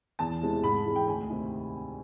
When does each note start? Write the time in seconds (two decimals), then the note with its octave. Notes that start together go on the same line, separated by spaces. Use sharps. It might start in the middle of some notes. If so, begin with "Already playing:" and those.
0.19 E2 A5
0.41 C3 E3 G#3
0.63 G#2 B5
0.85 E3 G#3
0.96 G5
1.07 D2 G#5
1.29 C3 D#3